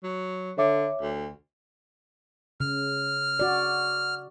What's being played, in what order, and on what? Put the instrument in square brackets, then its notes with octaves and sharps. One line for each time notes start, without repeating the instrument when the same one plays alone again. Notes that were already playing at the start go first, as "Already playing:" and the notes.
[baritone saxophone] F#3
[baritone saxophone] D3 [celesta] C#5 E5 D6
[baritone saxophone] D2
[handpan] C#3 [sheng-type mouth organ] F6
[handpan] F#4 D5